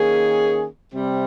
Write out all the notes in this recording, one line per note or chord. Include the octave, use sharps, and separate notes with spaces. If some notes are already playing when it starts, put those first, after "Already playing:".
Already playing: D#3 A#3 C#4 G#4
C3 G3 C4